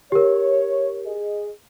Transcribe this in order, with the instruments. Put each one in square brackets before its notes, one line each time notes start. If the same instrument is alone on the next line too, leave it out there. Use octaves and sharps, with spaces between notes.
[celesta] G4 A#4 [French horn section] C#5
[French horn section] G#4 D#5